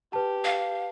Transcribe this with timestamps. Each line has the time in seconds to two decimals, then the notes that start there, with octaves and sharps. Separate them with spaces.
0.13 G4 B4 A5
0.44 F5